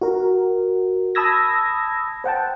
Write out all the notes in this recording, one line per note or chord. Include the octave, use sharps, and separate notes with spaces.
F#4 A#4
A5 B5 D#6 E6 G#6 A#6
C5 F#5 G5 A5